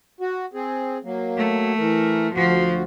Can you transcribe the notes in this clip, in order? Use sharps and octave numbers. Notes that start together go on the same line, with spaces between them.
F#4
C4 G#4
F#3 A#3
A3
E3 A#4
D2 F3 F#4